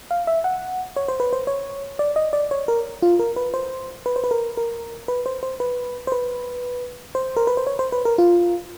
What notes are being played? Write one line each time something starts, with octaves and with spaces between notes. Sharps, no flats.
F5
E5
F#5
C#5
C5
B4
C5
C#5
D5
D#5
D5
C#5
A#4
F4
A#4
B4
C5
B4
C5
B4
A#4
A#4
B4
C5
C5
B4
C5
B4
C5
A#4
B4
C5
C#5
C5
B4
A#4
F4